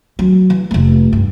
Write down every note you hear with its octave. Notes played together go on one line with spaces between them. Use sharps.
F#3
E3
F1 A3
G2